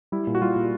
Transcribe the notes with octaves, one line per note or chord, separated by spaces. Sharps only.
G3 E4
A#2
F#4
G3 F4
A#2